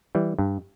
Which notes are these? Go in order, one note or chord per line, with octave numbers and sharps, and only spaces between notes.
E3 G3
G2